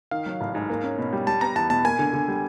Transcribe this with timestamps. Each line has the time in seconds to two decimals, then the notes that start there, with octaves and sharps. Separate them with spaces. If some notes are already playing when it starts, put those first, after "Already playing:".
0.11 D#3 F5
0.26 F#3
0.41 A1
0.55 G#2
0.69 A#3
0.83 C#4
0.98 B2
1.13 G3
1.27 G3 A5
1.41 B3 A#5
1.56 E2 A5
1.70 B2 A5
1.85 A#3 G#5
1.99 D3
2.14 D3
2.28 G3